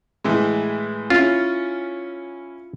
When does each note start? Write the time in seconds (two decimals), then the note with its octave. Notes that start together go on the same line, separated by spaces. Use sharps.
0.24 A2 E3 G#3
1.10 C#4 E4 F4